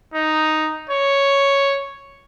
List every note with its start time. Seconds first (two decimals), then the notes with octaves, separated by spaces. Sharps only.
0.14 D#4
0.90 C#5